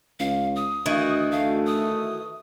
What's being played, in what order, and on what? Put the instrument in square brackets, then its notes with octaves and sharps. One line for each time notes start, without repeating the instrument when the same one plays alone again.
[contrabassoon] C#2 [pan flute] F5
[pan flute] D#6
[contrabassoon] D2 [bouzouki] D#3 E3 F#4
[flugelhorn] A3 [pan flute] F5
[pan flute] D#6